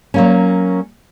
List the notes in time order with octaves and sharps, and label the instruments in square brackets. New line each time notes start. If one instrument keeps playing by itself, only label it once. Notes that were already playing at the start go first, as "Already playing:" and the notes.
[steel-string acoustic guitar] F#3 A#3 C#4